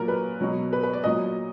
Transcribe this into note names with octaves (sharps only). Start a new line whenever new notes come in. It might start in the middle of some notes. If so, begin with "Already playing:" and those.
Already playing: A#2 F#3 A#4
B4
B2 F#3
B4
B4
D5
A#2 F#3 D#5